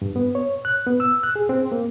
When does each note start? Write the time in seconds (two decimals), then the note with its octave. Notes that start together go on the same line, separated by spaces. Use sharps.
0.02 G2
0.16 B3
0.35 C#5
0.65 F#6
0.87 B3
1.00 E6
1.23 F#6
1.36 G#4
1.49 C4
1.72 A#3